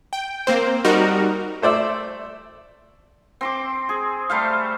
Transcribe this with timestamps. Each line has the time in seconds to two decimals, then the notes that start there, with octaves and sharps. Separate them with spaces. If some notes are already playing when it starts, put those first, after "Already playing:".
0.13 G5
0.47 A#3 C4 C5
0.84 G3 D#4 F#4 A#4
1.62 A3 C5 D5 E5
3.41 C4 C6 D6
3.89 G#4
4.30 G3 A3 C5 F5